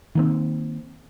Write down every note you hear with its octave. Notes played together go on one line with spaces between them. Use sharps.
D#3 A#3 C4